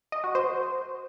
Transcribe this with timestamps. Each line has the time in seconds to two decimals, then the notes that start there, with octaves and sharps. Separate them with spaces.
0.12 D#5
0.24 F#4
0.35 C5